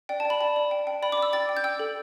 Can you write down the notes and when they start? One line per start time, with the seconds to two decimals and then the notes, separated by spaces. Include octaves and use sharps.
0.09 D5 G5
0.20 A5
0.25 D5
0.30 B5
0.41 D5 A5
0.56 D5
0.71 G5
0.87 G5
1.03 D5 B5
1.12 D6
1.17 D5
1.22 E6
1.33 G5 A6
1.49 G5
1.57 G6
1.64 G5 E6
1.79 A4